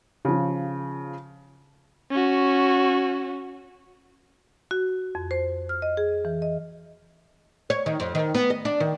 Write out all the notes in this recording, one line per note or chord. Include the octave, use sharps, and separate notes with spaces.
C#3 F3
C#4 F#4
F#4
F2
C5
F6
D#5
G#4
E3
D#5
C#5
D#3
F2
D#3
B3
D#5
D4
D#3